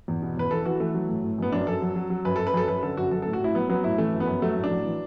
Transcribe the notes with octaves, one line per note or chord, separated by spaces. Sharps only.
E2
B2
E2 B4
E3 A4
E3 F#4
E3 A3
F#3
A2
A2
F#2 B3
F#2 D4
F#2 A4
F#3
F#3
F#3
F#2 B4
F#2 A4
B4
F#2 A4
F#2 B4
D3 A4
F#2 F#4
F#3 A4
A2 A4
F#4
A2 E4
F#3 B3
F#3 B3
A2 E4
E3 A3
F#2
B3
F#2
F#3 A3
A2
D4
F#3
E3